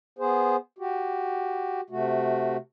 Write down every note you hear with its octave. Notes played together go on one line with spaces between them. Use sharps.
B3 G#4 C5
F#4 G4
C3 A3 F#4